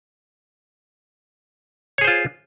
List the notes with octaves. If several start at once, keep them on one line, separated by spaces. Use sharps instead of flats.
F4 G#4 C5 C#5